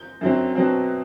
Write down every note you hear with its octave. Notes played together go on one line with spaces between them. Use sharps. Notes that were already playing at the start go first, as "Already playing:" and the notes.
Already playing: G6
F#2 D3 F#3 C4
B2 F#3 C4